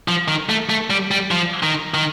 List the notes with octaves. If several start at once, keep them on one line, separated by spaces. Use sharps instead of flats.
F3
D#3
A3
A3
G3
G3
F3
D#3
D#3